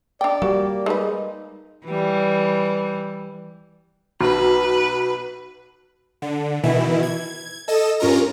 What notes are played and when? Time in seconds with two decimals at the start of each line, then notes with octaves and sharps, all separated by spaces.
0.21 D4 D5 G5
0.42 G3 A#3 F#4
0.86 G#3 D#4 B4
1.86 E3 G3
4.21 B1 B4
6.22 D3
6.63 B2 D#3 E3 E4
7.03 G#6
7.68 A4 D#5 E7
8.00 G2 C#4 F4 A#4 A#5